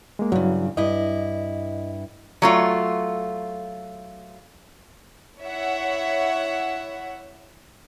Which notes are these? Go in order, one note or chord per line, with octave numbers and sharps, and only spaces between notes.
G#3 A#3
G2 C#3 F#3 E4
G2 E4 D#5
F#3 A3 F4
E4 C#5 E5 F#5